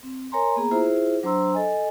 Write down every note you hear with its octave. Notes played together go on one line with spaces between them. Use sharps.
C4
A#4 C#5 G#5 A#5 C6
A#3 B3 G#4 A#5
E4 F4 G#4 C5 E5
F#3 D4 C5 A#5 C6 E6
A4 D#5 G#5